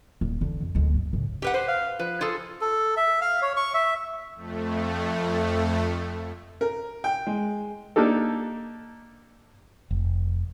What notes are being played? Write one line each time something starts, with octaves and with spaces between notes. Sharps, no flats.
D#1
D3 E3
F2
D2 G#3
G2
A2 C#3
G4 B4 F#5
B4 C5
F5
F3 B4
F4 G#4 A4
A4
E5
F5
C#5
C#6
E5
F2 A3
A#4
G5
G#3
A#3 D4 D#4 G4 A4
F1